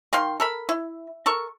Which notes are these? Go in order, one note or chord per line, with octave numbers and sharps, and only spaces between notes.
D#3 F5 G5 C6
A4 A#4 B5
E4
A4 A#4 C#6